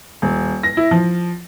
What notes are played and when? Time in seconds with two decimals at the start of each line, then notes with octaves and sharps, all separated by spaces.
0.22 D#1
0.63 A#6
0.77 E4
0.91 F3